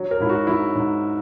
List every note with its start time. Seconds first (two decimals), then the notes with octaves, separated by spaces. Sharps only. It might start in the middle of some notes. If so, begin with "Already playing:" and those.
Already playing: F#3
0.11 A#4
0.20 G#2 E4
0.29 F#4
0.47 F#3 E4
0.75 G#2